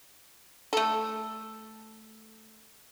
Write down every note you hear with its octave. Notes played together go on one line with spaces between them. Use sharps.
A3 A4